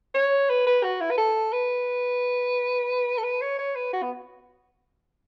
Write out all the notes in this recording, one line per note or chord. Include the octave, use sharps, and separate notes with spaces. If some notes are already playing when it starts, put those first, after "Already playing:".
C#5
B4
B4
F#4
E4
B4
A4
B4
A4
B4
C#5
C#5
B4
F#4
B3